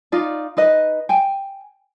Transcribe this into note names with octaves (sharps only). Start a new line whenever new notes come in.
D#4 F4 D5
D#4 B4 D#5
G5 G#5